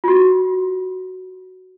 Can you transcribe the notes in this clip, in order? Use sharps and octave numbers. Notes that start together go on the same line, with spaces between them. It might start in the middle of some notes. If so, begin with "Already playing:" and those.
F4 F#4